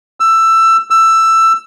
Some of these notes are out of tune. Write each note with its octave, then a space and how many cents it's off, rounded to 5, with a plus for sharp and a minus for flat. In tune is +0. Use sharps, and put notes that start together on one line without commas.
E6 +15
E6 +15